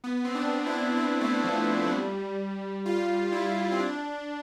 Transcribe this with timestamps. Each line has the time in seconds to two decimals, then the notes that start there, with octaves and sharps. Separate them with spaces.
0.04 B3
0.25 C4
0.35 D4
0.66 E4
0.97 C4
1.21 A3
1.44 F3
1.86 F3
1.92 G3
2.86 F4
3.32 E4
3.72 C4
3.80 D4